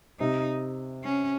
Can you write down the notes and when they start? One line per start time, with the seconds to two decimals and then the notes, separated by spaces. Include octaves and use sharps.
0.20 C3 D#4
1.04 C#4